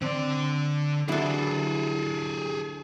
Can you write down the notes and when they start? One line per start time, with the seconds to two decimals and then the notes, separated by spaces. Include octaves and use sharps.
0.02 D3 C4 D5
1.08 D3 E3 F#3 D4 E4 G#4 A4